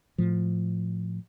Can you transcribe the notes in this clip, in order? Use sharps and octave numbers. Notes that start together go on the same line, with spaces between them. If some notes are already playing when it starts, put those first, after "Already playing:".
A2 F3